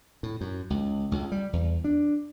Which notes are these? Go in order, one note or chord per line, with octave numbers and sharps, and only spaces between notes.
A2
F#2
C#2
C#2
G3
E2
D4